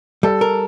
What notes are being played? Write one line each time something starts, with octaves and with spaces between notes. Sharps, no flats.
G3 A4
A#4